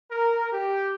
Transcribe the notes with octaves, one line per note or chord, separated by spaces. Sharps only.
A#4
G4